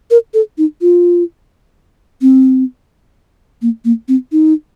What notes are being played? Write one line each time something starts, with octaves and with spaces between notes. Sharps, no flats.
A#4
A4
D#4
F4
C4
A#3
A#3
C4
D#4